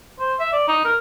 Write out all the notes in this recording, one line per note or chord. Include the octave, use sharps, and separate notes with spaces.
C5
E5
D5
D#4
A#4